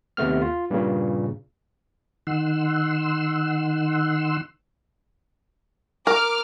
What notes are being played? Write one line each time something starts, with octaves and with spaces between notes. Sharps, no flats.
D#2 C3 A3 B3 F6
F4
G2 A#2 C#3
D#3 F#5 C6 E6
A#4 D6 F6